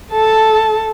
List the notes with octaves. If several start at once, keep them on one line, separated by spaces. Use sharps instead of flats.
A4 A5